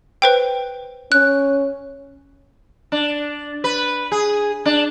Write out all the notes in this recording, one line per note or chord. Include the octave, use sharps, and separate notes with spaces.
B4 C5 G5
C#4 F#6
D4
B4
G#4
D4